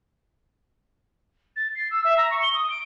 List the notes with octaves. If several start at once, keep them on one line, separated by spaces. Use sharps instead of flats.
A6
C7
E6
E5
A#5
C#6
G7
D#6
D7